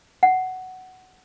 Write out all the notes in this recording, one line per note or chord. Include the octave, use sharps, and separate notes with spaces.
F#5